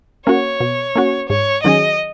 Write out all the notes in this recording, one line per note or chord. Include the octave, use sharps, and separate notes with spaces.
A#3 C#4 F#4 C#5
B2
A#3 C#4 F#4
G#2 C#5
D#3 F#3 C#4 G#4 D#5